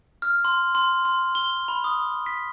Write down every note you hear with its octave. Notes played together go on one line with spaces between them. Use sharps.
F6
C6
C6
C6
G7
B5
D#6
B6